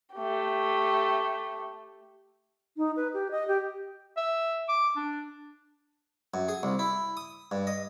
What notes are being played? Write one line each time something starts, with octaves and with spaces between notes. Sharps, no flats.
A3 G4
D#4
B4
G4
D#5
G4
E5
D6
D4
F#2
G#4
C2
E4
D#6
G2
D#5